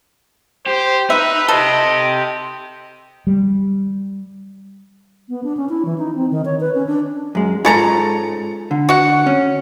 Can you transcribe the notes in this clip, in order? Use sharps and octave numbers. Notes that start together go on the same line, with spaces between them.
G4 C5
D#4 B4 E5
G4 A4 C5 D#5
G3
B3
D4
C#4
E4
E3
D#4
C4
D#3
C#5
B4
C#4
D4
F#2 G#3
G#2 C#3 F4 A4 A#5
D3
F#4 F#5
C#4